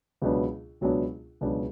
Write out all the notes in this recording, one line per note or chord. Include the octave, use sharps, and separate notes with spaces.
C#2 B2 F#3 B3 D4
C#2 B2 F#3 B3 D4
C#2 B2 F#3 B3 D4